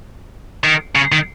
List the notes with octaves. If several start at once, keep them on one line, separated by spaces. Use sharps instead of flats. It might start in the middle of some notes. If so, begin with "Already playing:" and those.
D#3
C#3
D#3